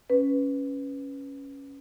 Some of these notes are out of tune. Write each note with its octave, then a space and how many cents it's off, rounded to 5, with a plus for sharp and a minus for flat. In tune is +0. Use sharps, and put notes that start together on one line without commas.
C#4 +0 B4 +0